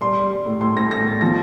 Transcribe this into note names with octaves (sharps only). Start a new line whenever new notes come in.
G3 C6
G3
G3
A2
A2 C6
A2 A#6
A2 A#6
A2 A6
F3 A#6